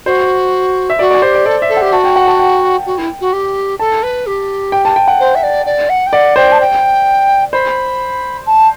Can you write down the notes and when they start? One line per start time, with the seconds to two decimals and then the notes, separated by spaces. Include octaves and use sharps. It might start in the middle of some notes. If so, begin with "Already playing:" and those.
0.05 F#4 C5
0.90 E5
0.99 F#4 D5
1.11 D5
1.22 G4 C5
1.35 D5
1.46 A4 D5
1.62 E5
1.69 A4
1.77 G4 F#5
1.92 F#4 A5
2.04 G5
2.16 F#5
2.28 A5
2.39 G5
2.86 F#4
2.97 E4
3.20 F#4
3.33 G4
3.79 A4 A5
4.03 B4
4.26 G4
4.72 G5
4.85 A5
4.96 G5
5.08 F#5
5.19 C5
5.35 E5
5.43 D5
5.66 D5
5.89 F#5
6.06 G5
6.13 D5 F#5
6.36 C5 G5
6.52 A5
6.60 G5
7.53 C5 B5
8.46 A5